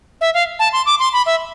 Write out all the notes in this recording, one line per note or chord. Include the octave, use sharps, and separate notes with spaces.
E5
F5
A5
C6
D6
C6
B5
E5